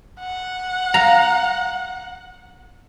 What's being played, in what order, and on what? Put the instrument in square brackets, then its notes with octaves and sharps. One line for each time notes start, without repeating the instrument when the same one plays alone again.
[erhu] F#5
[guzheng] F5 A#5